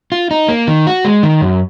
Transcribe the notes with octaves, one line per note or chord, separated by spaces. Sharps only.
F4
D#4
A#3
D#3
F#4
G#3
D#3
F#2